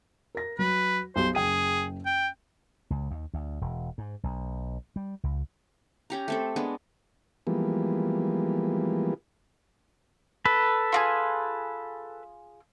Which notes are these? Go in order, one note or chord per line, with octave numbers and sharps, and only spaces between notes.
A#4 A#6
F#3 B4
B1 G4 C5
F#1 G#4 G5 D#7
G5
C#2
D#2
D2
E1
G#2
B1
G3
C#2
C#4 G4 A#5
A3 C4 A4
G#3 B3 D4
E3 F3 G3 G#3 A#3 B3
A4 B4
F4 F#4 G#4